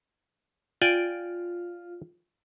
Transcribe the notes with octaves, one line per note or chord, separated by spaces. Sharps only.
F4 D5 G5 G#5